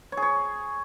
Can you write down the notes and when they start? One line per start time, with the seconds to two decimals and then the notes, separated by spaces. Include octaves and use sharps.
0.12 C#5
0.17 G#4
0.22 C#5